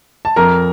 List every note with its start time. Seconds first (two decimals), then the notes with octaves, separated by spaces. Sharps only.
0.25 A5
0.36 F2 A#4 A#5